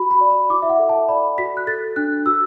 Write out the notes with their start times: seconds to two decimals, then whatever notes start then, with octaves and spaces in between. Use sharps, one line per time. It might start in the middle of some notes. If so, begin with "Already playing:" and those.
Already playing: F#4 B5
0.11 B5
0.21 D5
0.30 B5
0.50 E4 D6
0.62 E5
0.70 F#5
0.79 A4
0.89 A5
1.09 D5 B5
1.38 F#4 B6
1.57 F#6
1.67 A4 A6
1.96 D4 F#6
2.26 F#4 E6